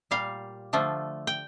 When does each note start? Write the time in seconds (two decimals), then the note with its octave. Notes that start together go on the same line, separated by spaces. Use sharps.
0.11 A#2 G3 F5
0.73 D3 F3 A3
1.27 G5